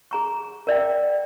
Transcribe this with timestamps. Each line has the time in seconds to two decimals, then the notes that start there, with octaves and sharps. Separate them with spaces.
0.11 G#4 A#5 C#6
0.67 A#4 D5 E5 G5